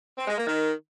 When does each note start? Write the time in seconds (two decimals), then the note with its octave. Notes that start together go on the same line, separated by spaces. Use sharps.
0.18 C4
0.28 G#3
0.37 A#3
0.47 D#3